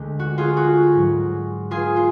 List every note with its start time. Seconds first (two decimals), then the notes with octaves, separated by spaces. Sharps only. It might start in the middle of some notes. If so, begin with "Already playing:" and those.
Already playing: D2 D3 G#3
0.19 F#4
0.38 F4 G#4
0.57 F#4
0.95 G#2 F#3
1.71 F4 G#4
1.96 F4